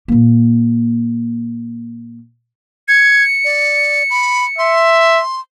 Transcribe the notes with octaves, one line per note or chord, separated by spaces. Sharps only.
A#2 A#3
G#6 C#7
D5
B5
E5 C6